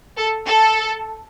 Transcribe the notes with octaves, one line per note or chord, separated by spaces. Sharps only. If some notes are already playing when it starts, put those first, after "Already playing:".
A4
A4